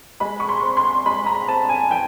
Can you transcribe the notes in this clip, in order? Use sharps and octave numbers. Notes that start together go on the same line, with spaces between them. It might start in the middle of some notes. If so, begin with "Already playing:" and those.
G#3 B5
C#6
C6
C4
C6
G#3 B5
A#5
C4 A5
G#5
E3 G5